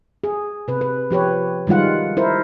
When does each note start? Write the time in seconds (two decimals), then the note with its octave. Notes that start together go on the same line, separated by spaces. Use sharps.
0.24 G#4
0.68 C3 B4
0.81 B4
1.11 F3 G4 B4 C#5
1.67 D#3 G3 G#3 F4 F#5
2.17 E4 A#4 C5